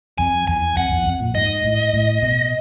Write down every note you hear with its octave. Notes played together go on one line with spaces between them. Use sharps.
F2 G#5
E2 G#5
F2 F#5
E2
F2
A#2
G#2 D#5
A2
A2
B2